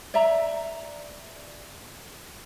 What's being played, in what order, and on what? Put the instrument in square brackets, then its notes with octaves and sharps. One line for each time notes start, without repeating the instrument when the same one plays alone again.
[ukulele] D5 E5 A#5